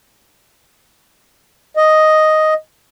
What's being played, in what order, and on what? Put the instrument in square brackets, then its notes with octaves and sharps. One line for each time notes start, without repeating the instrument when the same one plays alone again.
[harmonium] D#5